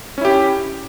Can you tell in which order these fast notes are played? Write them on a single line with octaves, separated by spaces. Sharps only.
C#4 E4 G4